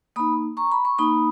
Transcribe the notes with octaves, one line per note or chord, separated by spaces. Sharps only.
A#3 D#4 B5 D#6
A#5 C#6
B5
C#6
A#3 D#4 B5 D#6